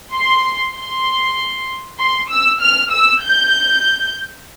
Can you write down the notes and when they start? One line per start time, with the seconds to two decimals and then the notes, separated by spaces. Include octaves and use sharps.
0.13 C6
0.75 C6
1.99 C6
2.30 E6
2.60 F6
2.91 E6
3.22 G6